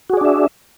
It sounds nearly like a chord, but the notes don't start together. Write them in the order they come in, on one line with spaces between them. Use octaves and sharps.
F#4 G#4 D5 D4 E5